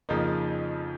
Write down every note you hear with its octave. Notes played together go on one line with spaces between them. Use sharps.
F2 C#3 F3 A#3 D#4